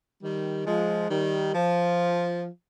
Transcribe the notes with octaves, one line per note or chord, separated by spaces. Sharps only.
D#3 G3
F3 G#3
D#3 G3
F3